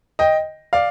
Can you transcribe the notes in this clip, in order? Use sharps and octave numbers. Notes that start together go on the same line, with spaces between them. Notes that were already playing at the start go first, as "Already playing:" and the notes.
D#5 G5
D5 F5